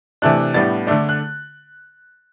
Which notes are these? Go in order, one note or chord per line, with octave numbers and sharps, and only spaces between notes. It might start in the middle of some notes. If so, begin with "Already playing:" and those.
C3 E3 A3 D4 F#6
A2 G3 B3 D4 A6
D3 A3 D4
F#6